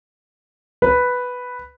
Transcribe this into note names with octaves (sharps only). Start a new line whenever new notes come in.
B4